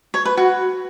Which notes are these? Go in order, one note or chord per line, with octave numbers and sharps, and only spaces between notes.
C#5
B4
F#4